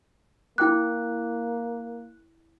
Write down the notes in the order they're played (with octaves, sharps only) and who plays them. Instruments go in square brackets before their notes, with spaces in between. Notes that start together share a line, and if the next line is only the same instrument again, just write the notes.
[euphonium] A#3 [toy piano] E4 G5 D6 [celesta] F#6